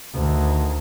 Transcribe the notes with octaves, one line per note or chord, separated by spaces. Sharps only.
D2 D#3